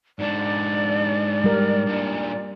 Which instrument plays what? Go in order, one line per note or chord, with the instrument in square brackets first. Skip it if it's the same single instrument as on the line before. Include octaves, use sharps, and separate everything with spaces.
[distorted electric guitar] G#2 D4 [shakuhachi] D5
[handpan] G3 A#4
[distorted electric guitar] G2 A#2